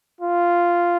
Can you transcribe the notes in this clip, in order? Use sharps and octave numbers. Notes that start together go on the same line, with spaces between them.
F4